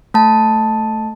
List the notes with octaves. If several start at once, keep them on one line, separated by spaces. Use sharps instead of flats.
A3 A5